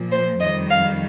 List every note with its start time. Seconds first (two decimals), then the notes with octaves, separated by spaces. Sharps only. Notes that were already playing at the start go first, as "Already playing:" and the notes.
Already playing: A#2 F3
0.11 C5
0.40 F2 D#3 G3 D#5
0.70 F5